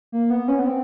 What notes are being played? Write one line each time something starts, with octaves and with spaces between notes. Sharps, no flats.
A#3
B3
C#4
B3
C4